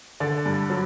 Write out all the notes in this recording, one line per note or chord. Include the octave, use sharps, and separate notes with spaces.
D3 D5
G2
F#3